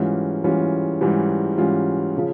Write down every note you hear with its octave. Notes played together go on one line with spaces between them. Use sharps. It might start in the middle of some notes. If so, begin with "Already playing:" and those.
Already playing: G#2 E3 G3 C#4 F4
G#2 E3 G3 C#4 F4
G#2 E3 G3 C#4 F4
G#2 E3 G3 C#4 F4
C#3 F3